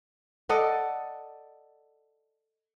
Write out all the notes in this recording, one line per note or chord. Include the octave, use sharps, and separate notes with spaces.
A4 D5 D#5 F#5